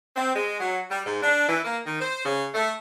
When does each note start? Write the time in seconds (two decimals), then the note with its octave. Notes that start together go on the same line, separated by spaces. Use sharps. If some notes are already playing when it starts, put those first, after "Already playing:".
0.16 C4
0.35 G#3
0.60 F#3
0.91 G3
1.06 G#2
1.22 D4
1.49 E3
1.65 A#3
1.86 D#3
2.01 C5
2.25 C#3
2.54 A3